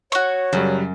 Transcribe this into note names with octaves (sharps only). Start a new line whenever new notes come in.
F#4 C#5 C#6
F#2 C#3 F#3 G3